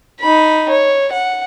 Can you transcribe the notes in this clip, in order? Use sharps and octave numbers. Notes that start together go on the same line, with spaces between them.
D#4 B5
C#5
F#5